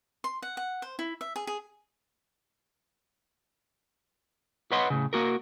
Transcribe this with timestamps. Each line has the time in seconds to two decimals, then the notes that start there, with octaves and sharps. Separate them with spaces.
0.24 C6
0.42 F#5
0.57 F#5
0.82 C5
0.99 E4
1.21 E5
1.36 G#4
1.47 G#4
4.72 B4 C#5 D#5 F#5 B5 C6
4.90 A2 C#3
5.13 A#3 F#4 A#4